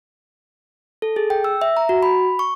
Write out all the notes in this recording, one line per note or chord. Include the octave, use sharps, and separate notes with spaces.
A4
G#4
G5
E6
E5
A#5
F#4
B5
C#6